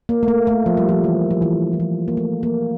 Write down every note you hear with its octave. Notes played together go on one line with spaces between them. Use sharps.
A#3
A3
A#3
A3
F3
G3
F3
E3
F3
E3
E3
F3
A#3
A3
A#3